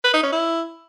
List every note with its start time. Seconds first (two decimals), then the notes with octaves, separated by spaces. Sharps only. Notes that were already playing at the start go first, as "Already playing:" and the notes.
0.04 B4
0.14 D#4
0.23 C#4
0.32 E4